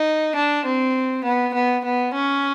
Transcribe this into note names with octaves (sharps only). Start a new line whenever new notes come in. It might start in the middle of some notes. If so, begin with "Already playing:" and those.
Already playing: D#4
D4
C4
B3
B3
B3
C#4